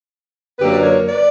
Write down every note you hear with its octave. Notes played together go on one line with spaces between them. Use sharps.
F#2 D3 F#3 A#3 G4 B4
D5
A#4 C#5
B4 D5